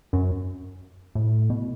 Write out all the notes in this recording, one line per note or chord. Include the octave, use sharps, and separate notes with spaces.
F#2
A2
B2